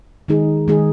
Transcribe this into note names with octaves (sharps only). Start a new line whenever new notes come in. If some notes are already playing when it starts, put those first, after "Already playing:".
D#3 G#3 D#4 G#4
D#3 G#3 D#4 G#4